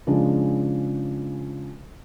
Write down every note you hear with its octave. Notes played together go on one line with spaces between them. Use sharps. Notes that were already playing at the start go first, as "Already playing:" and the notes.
C#3 F3 G#3 D4